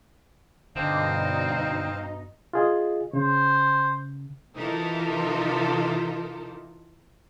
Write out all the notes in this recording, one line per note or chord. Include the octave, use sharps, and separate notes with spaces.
G2 B2 D3 C4 D#4 D#5 F5
F4 G#4 D#5
C#3 C5
C3 E3 D#4 F4 A4 A#4